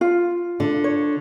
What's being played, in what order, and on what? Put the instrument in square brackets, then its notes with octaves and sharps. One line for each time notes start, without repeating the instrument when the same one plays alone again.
[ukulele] F4
[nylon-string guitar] D3
[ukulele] C#5